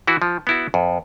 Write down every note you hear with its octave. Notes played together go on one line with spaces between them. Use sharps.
E3 E4 F#4
F3
B3 E4 F#4
F2